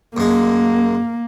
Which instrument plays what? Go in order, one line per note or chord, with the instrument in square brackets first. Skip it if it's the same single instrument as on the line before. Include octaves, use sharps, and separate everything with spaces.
[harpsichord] F#2 G#3 [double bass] A#3